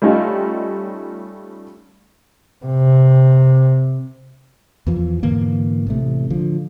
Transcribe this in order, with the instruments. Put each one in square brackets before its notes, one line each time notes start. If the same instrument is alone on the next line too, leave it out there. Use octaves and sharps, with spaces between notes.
[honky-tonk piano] G3 A3 C#4 D#4 F4 G4
[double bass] C3
[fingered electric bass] E2 E3 F3
G#2 D3 E3 A#3
A1 C3 A3
D3 F3